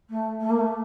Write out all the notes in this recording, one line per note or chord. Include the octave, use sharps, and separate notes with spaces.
A3
A3
A#3
A3